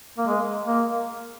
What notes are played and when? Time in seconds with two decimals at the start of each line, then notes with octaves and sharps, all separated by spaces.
0.18 A#3
0.27 G#3
0.67 A#3